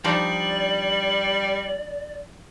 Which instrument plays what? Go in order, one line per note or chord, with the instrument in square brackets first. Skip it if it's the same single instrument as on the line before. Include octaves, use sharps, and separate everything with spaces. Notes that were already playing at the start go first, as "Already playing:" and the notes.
[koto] F3 D4 D#4 [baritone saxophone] G3 [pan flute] D5 [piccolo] F#7